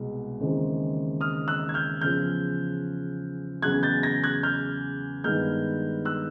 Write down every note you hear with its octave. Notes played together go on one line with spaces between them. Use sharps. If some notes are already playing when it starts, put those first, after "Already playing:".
Already playing: C2 B2 G#3
D#2 C#3 E3 G#3 C4
D#6 F6
E6 F#6
G#6
F6 G6
E2 C#3 F3 F6 G6
E2 C#3 F#3 F#6 G#6
G6 A6
G#6 A#6
F#6 G#6
F6 G6
G2 D#3 G#3 B3 F6 G6
E6 F#6